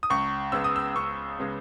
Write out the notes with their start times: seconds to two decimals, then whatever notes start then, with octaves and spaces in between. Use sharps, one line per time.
0.03 D#6
0.10 C#2 C#6
0.52 C#3 G#3 B3 E6
0.64 D#6
0.76 E6
0.95 C#2 C#6
1.39 C#3 G#3 B3